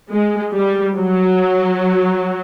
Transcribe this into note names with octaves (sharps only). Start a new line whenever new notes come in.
G#3
G3
F#3